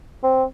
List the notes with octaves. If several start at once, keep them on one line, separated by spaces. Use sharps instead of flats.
C4